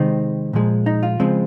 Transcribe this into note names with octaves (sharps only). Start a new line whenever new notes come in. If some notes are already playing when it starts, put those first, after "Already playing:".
Already playing: C3 D#3 G#3 C4 D#4
A#2 F3 G#3
D#4
F4
C#3 F3 G#3 C4